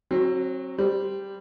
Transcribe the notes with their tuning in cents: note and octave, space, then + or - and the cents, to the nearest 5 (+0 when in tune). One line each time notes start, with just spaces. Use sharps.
F#3 +0 C4 +30
G3 +0 C5 -10